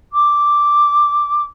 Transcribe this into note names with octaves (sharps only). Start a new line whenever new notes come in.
D6